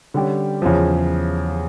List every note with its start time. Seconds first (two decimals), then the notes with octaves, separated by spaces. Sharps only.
0.14 D3 G3 C#4 G4
0.62 E2 C#3 F3